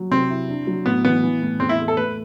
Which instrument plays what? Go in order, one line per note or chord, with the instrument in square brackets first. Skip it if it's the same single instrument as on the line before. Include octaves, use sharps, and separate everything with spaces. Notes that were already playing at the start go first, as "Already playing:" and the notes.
Already playing: [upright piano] F#3
[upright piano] C3 [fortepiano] C4
[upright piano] E4
D4
F#3
[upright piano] A2 [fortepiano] B3
[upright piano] E3 [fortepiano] B3
[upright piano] E3
A2
[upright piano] E2 [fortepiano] C4
[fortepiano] E4
[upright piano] A3
[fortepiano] A4
[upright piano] A3 [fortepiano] B4